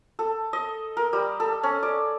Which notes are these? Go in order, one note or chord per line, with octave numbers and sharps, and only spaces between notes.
A4
D#5
A#4
G3
A4
C#4
D5